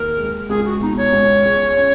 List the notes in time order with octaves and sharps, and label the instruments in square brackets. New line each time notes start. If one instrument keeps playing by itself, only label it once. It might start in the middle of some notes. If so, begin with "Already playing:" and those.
Already playing: [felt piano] D#2 [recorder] A#4
[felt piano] G#3
[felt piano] C#2 [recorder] G#4
[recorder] F#4
[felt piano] B2 [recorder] D#4
[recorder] C#5
[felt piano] C#2
G#3
C#4